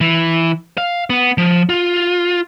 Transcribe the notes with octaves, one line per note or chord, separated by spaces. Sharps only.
E3
F5
B3
F3
F4